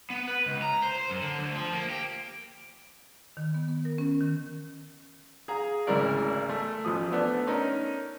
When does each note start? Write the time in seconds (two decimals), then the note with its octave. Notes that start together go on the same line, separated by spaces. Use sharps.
0.10 B3
0.28 B4
0.46 C#2
0.62 A#5
0.83 C5
0.98 C5
1.10 F#2
1.22 D3
1.39 D2
1.54 F3
1.73 A#3
1.90 G4
3.37 D#3
3.54 B3
3.68 B3
3.85 A#4
3.98 C#4
4.21 D#3
5.48 G#4 F5 A#5
5.87 G#1 D2 C#3 E4 A#4 D5
6.49 A3
6.85 A1 F3 D#6
7.12 A3 B3 D4
7.47 C#4 D#4 A#4